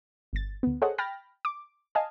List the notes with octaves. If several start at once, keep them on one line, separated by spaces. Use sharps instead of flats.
G1 A6
D2 B3
G#4 A4 C5 C#5 D#5 F#5
G5 B5 F6 A6 A#6
D6
D#5 F5 G#5 A5